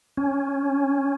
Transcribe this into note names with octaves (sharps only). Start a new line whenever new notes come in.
C#4